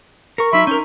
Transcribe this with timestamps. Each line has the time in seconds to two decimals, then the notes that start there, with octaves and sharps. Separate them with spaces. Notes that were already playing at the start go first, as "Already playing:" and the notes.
0.38 A#4 C#6 C#7
0.53 F#3 D#4 E5 B5 C6
0.67 C#4 A#4 G6